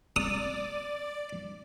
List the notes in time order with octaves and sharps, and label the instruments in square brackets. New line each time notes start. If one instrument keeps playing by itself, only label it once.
[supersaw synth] D5 [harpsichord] D#6